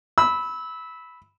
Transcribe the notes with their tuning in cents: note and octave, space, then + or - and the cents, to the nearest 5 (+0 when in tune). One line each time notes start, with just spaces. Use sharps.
B5 +0 E6 -20